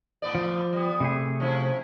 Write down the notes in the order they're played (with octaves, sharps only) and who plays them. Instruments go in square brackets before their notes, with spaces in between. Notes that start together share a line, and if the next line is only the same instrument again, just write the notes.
[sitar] A2 B3 D5
[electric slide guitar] F3
[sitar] G3 B3
[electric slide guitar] C3 A3 G#4
[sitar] F3 C#4 E4